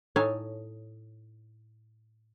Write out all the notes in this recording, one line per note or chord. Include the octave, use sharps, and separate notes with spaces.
A2 D#4 C#5 E5 G#5 A5